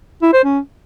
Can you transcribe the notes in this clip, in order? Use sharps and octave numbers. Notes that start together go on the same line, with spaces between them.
E4
C5
C#4